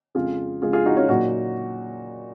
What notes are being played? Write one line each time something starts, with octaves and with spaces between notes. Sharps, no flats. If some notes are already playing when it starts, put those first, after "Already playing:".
F2 C#3 G#3 F4 G#4
F2 C#3 G#3 F4 G#4
F4 G#4
D#4 F#4
C#4 F4
A#2 F#3 D#4 F#4